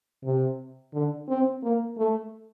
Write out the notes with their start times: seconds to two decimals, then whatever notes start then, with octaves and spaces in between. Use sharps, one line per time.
0.23 C3
0.93 D3
1.28 C4
1.63 A#3
1.98 A3